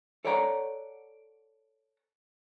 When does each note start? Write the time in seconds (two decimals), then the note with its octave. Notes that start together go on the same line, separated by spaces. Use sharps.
0.25 A4 C#5 D5 F#5 A5 A#5